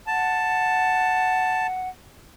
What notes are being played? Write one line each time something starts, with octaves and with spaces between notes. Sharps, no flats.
F#5 A5